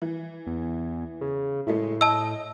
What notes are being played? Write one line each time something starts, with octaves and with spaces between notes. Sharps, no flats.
E3
E2
C#3
A2 G#3 A3 E4
D#5 A5 E6